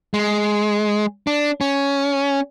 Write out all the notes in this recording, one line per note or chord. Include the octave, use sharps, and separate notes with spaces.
G#3
D4
C#4